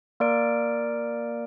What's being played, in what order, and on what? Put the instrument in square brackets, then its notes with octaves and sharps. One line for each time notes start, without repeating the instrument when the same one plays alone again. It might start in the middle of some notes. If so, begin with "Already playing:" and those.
[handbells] A#3 A#4 D5 D7